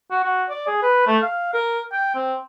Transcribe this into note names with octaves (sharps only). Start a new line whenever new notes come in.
F#4
F#4
D5
G#4
B4
A3
F5
A#4
G5
C4